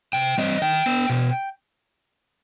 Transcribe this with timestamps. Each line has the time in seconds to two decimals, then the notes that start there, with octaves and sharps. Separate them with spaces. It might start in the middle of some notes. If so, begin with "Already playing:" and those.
0.13 C3 G5
0.38 G3 C4 D#5
0.62 D#3 G5
0.86 B3
1.09 B2